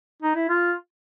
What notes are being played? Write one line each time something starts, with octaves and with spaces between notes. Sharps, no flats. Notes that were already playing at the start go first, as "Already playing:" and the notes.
D#4
E4
F4